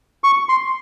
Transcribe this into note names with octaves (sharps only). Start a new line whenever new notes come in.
C#6
C6